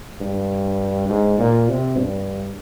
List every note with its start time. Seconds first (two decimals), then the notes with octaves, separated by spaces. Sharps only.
0.21 G2
1.09 G#2
1.39 A#2
1.69 C3
1.97 G2